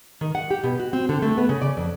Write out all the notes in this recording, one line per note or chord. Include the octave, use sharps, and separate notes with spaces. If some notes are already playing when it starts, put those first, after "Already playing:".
D#3
F#5
G4
B2
F#4
C4
D3
A3
B3
C#3
D5
F2